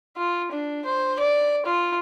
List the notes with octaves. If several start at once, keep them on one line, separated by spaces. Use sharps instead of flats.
F4
D4
C5
D5
F4